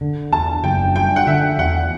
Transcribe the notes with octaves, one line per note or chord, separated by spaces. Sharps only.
D3
E2 A5
F#1 G5
G3 G5
F#5
D3 E5
E2 F#5